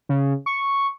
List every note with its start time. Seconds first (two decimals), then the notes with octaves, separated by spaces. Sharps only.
0.09 C#3
0.46 C#6